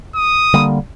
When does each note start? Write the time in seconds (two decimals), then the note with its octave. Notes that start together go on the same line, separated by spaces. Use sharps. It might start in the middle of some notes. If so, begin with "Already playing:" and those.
0.16 D#6
0.54 D3 G3 A#3